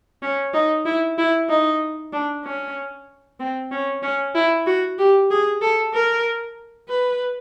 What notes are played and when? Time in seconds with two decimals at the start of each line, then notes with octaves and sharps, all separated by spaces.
0.23 C#4
0.54 D#4
0.85 E4
1.18 E4
1.49 D#4
2.13 D4
2.44 C#4
3.40 C4
3.72 C#4
4.03 C#4
4.35 E4
4.66 F#4
4.99 G4
5.31 G#4
5.62 A4
5.94 A#4
6.89 B4